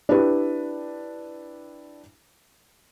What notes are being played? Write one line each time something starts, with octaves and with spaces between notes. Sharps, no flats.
D4 E4 G4 B4